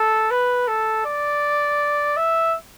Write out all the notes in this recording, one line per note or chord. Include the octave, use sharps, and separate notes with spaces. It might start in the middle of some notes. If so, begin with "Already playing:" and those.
Already playing: A4
B4
A4
D5
E5